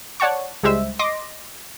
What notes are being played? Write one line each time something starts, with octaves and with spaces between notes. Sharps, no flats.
C#5 D5 F#5 A5 C#6
C#2 G3 G#3 C5 E5 E6
D#5 C6 D6 A#6